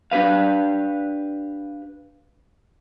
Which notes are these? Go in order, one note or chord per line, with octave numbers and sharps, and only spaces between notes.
D4 G4 B4 F5